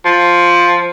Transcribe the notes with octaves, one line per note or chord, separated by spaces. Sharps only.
F3